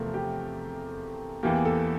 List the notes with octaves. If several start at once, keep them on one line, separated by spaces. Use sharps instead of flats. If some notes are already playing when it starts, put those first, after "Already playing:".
Already playing: E2 C3 F3 A3 C4 A#4
G4
E2 E3 A#3 G4
A4